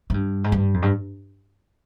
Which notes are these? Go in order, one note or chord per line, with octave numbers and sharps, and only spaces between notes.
G#2
G2
G#2
G2
F2
G2